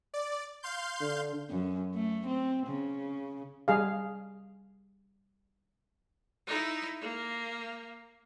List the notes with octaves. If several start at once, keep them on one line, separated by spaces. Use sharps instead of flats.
D5
F5 C6 G6
D3
F#2
A3
C4
C#3
G3 G#4 F5
D#4 E4
A#3